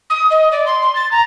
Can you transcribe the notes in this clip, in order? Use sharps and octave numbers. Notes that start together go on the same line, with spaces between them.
D#6
D#5
D5
C6
C6
A6
A#5